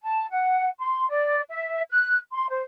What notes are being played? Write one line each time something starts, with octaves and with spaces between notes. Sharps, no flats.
A5
F#5
C6
D5
E5
F#6
C6
C5